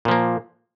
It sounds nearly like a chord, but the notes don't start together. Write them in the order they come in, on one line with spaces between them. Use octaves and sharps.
A#2 F3 A#3